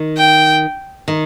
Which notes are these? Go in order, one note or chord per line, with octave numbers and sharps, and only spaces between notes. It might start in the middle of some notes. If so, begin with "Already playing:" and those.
Already playing: D#3
G5
D#3